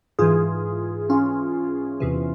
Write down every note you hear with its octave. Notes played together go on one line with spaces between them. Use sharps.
G#2 E3 F4 G#4
C#4 F4
E2 C3 E3